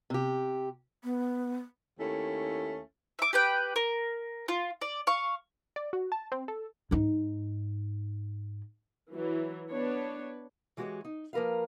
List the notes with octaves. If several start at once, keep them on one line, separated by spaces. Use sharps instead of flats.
C3 G4
B3
D#2 A3 C#4 E4
E5 D6
G4 B4 G5
A#4
F4
D5
F5 C#6
D5
F#4
A5
C4
A4
G#2 D#4
E3 F#3
B3 D4 B4 C#5
E3 G#3 F#4 G4 C#5 D#5
D#4
F3 A#3 A#4 B4 F5